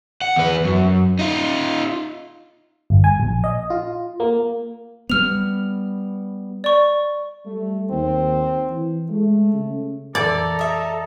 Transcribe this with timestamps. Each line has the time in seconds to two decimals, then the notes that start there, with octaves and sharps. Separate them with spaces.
0.22 F#5
0.36 E2 B4
0.65 F#2
1.19 D#4 F4
2.90 G1
3.04 G#5
3.20 A#1
3.44 D#5
3.70 F4
4.20 A#3
5.10 G3 B3 F6 F7
6.64 D5 C#6
7.46 G3 A3
7.90 D#2 C4
8.71 E3
9.10 G#3 A3
9.53 C#3
10.15 F2 A#2 E3 A4 D5 A#5
10.59 D#5 E5